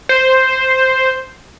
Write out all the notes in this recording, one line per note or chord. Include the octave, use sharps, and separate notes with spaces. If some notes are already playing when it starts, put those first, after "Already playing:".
C5